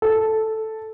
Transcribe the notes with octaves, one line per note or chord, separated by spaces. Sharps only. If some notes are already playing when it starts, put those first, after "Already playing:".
A4